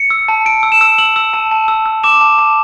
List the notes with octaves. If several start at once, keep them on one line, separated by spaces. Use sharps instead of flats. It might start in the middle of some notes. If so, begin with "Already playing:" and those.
Already playing: C#7
E6
A5
A5 D7
E6
E7
E6
E6 F#7
E6
A5
A5
E6
E6
D6 E7
A5
A5